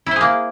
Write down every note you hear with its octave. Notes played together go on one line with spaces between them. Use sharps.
A#3 E4 G#4 C5